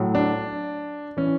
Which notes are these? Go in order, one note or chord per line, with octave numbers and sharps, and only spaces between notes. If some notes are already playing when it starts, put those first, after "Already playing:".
Already playing: A2 F#3
D4
E3 C#4